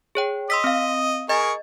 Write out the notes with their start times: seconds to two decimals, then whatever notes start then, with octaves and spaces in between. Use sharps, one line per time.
0.15 G#4 C#5 G5
0.50 D#5 C6 E6 B6
0.64 C4 F5
1.29 G#4 A#4 D#5 C#6 A6